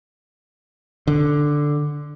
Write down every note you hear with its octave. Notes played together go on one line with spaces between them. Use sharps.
D3